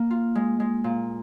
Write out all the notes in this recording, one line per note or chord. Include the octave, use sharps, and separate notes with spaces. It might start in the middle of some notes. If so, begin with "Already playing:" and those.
Already playing: A#3
F4
G#3
G#3
A#2